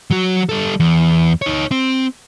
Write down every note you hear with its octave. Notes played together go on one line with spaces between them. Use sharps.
F#3 F#4
G3 A4
E2
D#4 C#5
C4